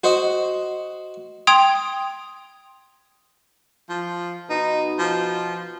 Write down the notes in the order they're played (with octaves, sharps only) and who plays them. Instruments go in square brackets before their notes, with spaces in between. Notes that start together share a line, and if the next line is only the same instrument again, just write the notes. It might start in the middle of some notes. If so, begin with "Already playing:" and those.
[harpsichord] F#4 C5 D#5
[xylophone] G5 C6 D#6 G#6 D7 F7
[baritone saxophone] F3
[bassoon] B2 [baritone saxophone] D#4
[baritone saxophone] F3